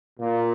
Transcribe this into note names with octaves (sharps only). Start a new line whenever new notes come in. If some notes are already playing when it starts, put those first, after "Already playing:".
A#2